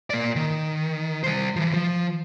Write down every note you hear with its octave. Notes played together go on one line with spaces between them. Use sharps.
A#3 D5
D#3
G3 C5
E3 F3
F3